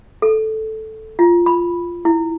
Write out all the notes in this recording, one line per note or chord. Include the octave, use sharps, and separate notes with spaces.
A4
F4
B5
E4